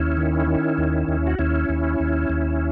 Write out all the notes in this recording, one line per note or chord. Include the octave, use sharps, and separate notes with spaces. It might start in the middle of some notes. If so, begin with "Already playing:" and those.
Already playing: D#2 C#4 E4
D#3
D#3
D#2
D#2
F#4
D#2 C#4 E4
D#2
D#2
D#2